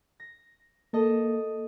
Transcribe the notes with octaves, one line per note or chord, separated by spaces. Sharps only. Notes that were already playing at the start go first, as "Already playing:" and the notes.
A#6
A#3 A4 D#5